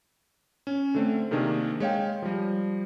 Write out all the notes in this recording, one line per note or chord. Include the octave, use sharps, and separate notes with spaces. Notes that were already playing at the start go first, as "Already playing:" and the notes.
C#4
D3 A3 C4
C3 D#3 A#3 D4 G#4 A#4
G#3 C#5 F5 G5
F3 G3